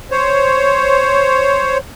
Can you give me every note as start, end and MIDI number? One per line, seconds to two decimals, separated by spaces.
0.11 1.78 72
0.11 1.78 73